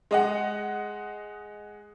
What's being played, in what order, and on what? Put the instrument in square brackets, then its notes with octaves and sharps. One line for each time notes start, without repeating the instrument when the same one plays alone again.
[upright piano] G#3 D#5 F#5